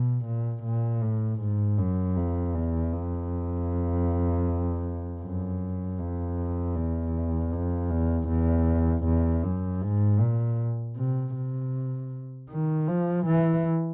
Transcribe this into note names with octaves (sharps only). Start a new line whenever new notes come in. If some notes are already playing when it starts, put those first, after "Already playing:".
Already playing: B2
A#2
A#2
A2
G#2
F#2
F2
E2
F2
F#2
F2
E2
F2
E2
E2
E2
F#2
G#2
A#2
C3
C3
D#3
F3
E3